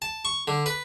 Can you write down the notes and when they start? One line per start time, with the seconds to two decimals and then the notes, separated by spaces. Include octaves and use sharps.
0.02 A5
0.25 C#6
0.48 D3
0.66 B4